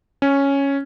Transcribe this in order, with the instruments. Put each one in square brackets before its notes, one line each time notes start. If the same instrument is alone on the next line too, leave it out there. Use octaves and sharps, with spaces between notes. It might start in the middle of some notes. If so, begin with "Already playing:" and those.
[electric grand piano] C#4